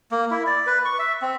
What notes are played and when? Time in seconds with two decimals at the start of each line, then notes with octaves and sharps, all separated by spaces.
0.11 A#3
0.31 E4
0.47 D5
0.67 B4
0.85 C#6
0.99 E5
1.22 C4